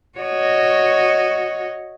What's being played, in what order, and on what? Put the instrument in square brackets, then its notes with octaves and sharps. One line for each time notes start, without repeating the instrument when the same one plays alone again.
[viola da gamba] F#4 C#5 D#5